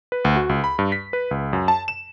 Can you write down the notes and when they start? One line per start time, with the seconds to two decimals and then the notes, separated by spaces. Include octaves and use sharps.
0.12 B4
0.25 D2
0.36 F#4
0.49 C#2
0.64 B5
0.79 G2
0.92 B6
1.13 B4
1.31 C#2
1.53 F#2
1.68 A5
1.88 E7